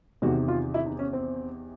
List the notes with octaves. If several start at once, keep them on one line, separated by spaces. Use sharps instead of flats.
E2 C3 D#3 F#4
F4
E4
D#4
C#4
C4